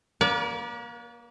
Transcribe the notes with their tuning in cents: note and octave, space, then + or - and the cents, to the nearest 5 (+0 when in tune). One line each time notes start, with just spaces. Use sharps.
A#3 +25 B4 -40 D5 -40